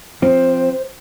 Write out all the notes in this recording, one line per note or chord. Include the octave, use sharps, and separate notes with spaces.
F3 C4 C5